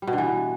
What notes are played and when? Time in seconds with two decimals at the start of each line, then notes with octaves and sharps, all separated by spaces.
0.02 G3
0.07 B2
0.13 D3
0.18 E3